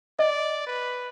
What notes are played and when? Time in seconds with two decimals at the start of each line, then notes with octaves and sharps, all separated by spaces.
0.19 D5 D#5
0.67 B4